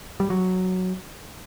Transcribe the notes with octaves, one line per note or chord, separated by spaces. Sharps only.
G3
F#3